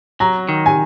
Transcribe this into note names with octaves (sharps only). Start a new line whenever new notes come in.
F#3 A#5
D#3
G#5